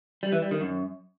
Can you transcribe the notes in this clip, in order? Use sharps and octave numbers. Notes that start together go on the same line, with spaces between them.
G3
E3
G3
D#3
F#2